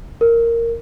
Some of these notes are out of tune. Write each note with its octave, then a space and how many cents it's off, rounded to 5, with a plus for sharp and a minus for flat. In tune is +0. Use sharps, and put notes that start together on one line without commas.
A#4 -10